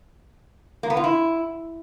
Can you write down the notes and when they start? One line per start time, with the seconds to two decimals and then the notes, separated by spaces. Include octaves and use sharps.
0.83 A#3
0.90 B3
0.97 F4
1.04 E4